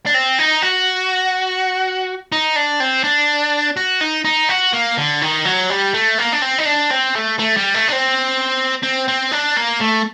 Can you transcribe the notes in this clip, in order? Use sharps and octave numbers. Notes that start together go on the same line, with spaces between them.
D4
C4
D#4
F#4
D#4
D4
C4
D4
F#4
D#4
D#4
F#4
A#3
D3
D#3
F#3
G3
A3
A#3
D4
C4
D#4
D4
C4
A3
A3
G3
A3
D4
C4
C4
C4
D4
A#3
A3